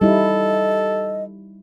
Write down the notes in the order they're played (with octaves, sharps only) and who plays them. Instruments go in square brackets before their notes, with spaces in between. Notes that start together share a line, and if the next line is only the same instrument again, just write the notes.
[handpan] G3 D#4 E4 [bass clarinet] A4 [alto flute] D#5